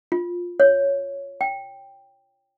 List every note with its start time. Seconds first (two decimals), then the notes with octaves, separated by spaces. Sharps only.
0.12 F4
0.60 C#5
1.41 G5